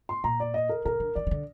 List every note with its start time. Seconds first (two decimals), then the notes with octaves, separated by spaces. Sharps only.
0.09 C6
0.24 A#2 A#5
0.40 D5
0.54 D#5
0.69 A#4
0.85 C3 A#4
1.00 D3
1.15 D#3 D5
1.27 D#3
1.31 D3